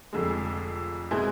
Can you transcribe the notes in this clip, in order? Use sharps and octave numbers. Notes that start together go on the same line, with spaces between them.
F1 F2 D3 G#3
B2 G#3 C4 E4 G#4